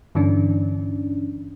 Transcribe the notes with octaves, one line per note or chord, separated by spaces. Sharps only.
G2 D3 E3 C#4 D4